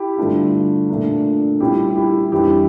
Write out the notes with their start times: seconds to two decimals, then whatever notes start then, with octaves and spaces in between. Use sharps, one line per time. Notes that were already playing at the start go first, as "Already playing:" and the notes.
Already playing: E4 G4
0.17 G2 D3 A3 D4 F4
0.90 A#2 A3 D4
1.60 A#2 G3 C#4 E4 F4 G4
1.95 E4 G4
2.32 F2 E3 G3 D4 E4 G4